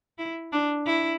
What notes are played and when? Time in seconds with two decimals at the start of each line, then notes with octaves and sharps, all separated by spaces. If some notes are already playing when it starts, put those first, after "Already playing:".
0.18 E4
0.53 D4
0.86 E4